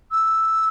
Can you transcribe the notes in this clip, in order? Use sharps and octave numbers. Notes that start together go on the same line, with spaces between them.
E6